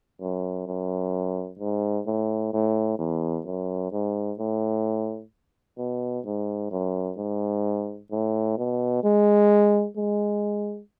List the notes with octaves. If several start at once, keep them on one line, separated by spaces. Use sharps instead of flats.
F#2
F#2
G#2
A2
A2
E2
F#2
G#2
A2
B2
G#2
F#2
G#2
A2
B2
G#3
G#3